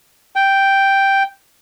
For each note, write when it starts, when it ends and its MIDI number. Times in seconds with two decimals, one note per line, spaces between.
0.36 1.23 79